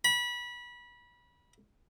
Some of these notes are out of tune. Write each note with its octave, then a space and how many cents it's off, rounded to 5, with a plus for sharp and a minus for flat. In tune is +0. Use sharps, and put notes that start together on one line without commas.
B5 -25